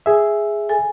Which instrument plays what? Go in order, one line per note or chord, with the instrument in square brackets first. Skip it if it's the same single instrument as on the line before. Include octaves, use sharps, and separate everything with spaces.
[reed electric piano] G#4 E5
[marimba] A4 G#5